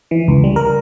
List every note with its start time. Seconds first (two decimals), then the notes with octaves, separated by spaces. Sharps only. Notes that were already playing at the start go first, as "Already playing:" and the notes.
0.11 E3
0.28 C#2
0.44 G3
0.56 A#4